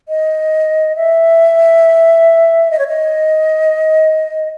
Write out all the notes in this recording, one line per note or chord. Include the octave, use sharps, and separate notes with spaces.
D#5
E5
D#5
C#5
D#5